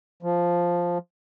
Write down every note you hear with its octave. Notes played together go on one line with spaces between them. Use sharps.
F3